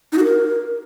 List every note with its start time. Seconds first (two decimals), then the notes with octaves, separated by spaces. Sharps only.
0.12 D#4
0.18 F#4
0.23 A#4